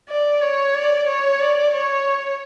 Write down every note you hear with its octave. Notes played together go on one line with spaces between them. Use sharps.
D5
C#5
D5
C#5
D5
C#5